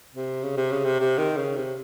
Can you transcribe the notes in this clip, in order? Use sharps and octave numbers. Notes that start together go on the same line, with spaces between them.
C3
C#3
C3
C#3
C3
C3
D#3
C#3
C3